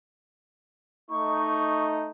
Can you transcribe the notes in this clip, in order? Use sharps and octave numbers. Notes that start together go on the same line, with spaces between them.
A3 D#4 C#6